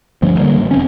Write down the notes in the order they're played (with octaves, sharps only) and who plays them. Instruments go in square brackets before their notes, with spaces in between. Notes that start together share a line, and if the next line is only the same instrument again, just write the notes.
[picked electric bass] D2 G2 F3
D3 F#3 G3 A#3
A1
E1 C4 C#4